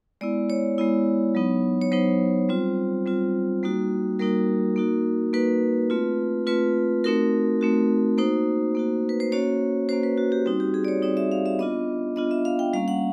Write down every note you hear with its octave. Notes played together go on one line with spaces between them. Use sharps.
G#3 B3 E4 D5
C#5
G#3 B3 E4
F#3 B3 D#4
C#5
F#3 B3 D#4 C5
G3 C4 F4
G3 C4 F4
G3 A#3 D#4 F#4
G3 A#3 D#4 F#4 A#4
A#3 D#4 F#4
A#3 D#4 F#4 B4
A3 C4 F4
A3 C4 F4 B4
A3 C4 D#4 F#4 A#4
A3 C4 D#4 F#4
A#3 D#4 F#4 C5
A#3 D#4 F#4
B4
C5
A#3 C#4 F#4 C#5
A#3 C#4 F#4 C5
B4
F#4
G4
G3 C4 D#4 F#4
G4
G#4
D5
C#5
G3 C4 D#4 D5
E5
F5
E5
B3 D4 F4 D#5
B3 D4 F4 D#5
E5
F5
G5
G3 A#3 C#4 F5
F#5